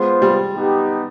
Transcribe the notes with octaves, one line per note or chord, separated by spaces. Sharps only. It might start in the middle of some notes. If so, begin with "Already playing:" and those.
Already playing: G#3 B3 F4 C5
G3
B3 D#4 G4